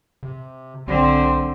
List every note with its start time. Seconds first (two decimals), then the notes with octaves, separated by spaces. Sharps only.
0.23 C3
0.87 B1 D3 C4